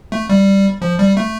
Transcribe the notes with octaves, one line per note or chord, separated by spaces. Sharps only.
A3
G3
F3
G3
A3